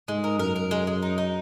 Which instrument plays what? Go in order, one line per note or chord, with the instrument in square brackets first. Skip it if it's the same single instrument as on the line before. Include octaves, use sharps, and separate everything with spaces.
[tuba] G#2 [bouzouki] G#3
[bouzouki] A#4
[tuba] F#2 [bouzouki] A#4
[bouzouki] A#4
G#3
G#3
D#4
D#4